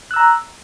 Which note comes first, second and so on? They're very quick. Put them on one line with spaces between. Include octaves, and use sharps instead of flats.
F#6 E6 A#5